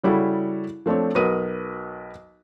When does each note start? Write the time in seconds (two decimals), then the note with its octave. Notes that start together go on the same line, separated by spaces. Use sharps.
0.04 C#3 G3 E4 F#4 G#4 A4
0.86 F3 A3 C4 D4 C#5
1.15 B1 F#4 A#4 B4 D#6 D#7